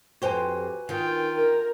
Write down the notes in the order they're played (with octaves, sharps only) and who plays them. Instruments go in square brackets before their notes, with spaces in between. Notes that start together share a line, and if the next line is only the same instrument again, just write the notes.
[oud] F2 G4 C5 [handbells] F#4 B4 G#5
[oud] D#3 [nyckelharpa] F4 G5
[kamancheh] A#4